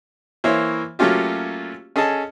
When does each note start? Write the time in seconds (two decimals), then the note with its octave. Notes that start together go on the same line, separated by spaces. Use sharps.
0.44 E3 A#3 E4 C5 C#5
0.99 F#3 A3 A#3 C#4 F4 G4
1.96 C#4 G#4 A4 D#5 A5